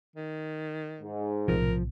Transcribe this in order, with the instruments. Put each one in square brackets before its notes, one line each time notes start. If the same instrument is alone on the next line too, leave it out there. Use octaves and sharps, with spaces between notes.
[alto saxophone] D#3
[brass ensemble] G#2
[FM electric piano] B1 A2 C3 [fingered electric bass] F3 [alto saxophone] A#4